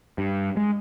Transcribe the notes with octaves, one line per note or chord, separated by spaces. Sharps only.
G2
G#3